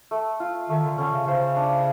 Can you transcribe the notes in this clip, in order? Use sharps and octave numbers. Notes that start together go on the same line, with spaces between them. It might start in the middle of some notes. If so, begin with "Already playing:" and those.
A3
F4
D#3 A3
D3
D3 C#4
C#3
C#3 C5
D4